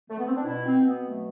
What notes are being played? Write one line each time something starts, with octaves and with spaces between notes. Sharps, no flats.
A3
B3
C4
D4
B2 E4
C4
B2
B3
F#3 A3